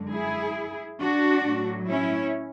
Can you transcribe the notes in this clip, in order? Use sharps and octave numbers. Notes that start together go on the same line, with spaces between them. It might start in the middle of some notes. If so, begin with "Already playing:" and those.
Already playing: F#2 D3 G#3
E4 G#4
D4 F#4
A2 F#3
C#4 E4